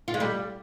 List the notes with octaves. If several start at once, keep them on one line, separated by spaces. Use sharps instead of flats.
F4
G#3
G3